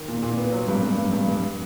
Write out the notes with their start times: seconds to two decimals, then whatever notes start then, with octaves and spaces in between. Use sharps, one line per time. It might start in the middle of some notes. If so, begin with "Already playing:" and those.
Already playing: D#3
0.08 A#2
0.23 A#2
0.37 B3
0.52 F#3
0.68 G2
0.83 G2
0.99 G2
1.13 G2
1.28 G2